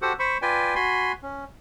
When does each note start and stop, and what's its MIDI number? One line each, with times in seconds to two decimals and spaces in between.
0.02 0.13 66
0.02 0.13 67
0.02 0.13 69
0.02 0.13 72
0.02 0.13 78
0.19 0.38 72
0.19 0.38 83
0.19 0.38 85
0.42 0.75 65
0.42 0.75 71
0.42 0.75 74
0.42 0.75 79
0.42 0.75 80
0.75 1.12 66
0.75 1.12 80
0.75 1.12 83
0.75 1.12 84
1.23 1.45 61